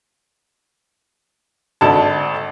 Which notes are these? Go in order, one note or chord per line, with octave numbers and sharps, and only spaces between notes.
G#1 D3 A5